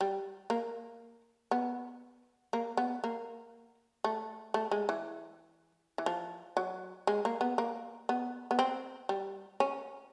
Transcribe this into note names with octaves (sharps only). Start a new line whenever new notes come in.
G3
A#3
B3
A#3
B3
A#3
A3
A3
G#3
E3
E3
F3
F#3
G#3
A#3
B3
A#3
B3
B3
C4
G3
C#4